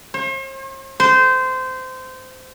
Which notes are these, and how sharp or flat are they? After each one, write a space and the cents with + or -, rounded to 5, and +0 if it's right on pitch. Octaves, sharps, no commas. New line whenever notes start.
C5 +45
C5 -20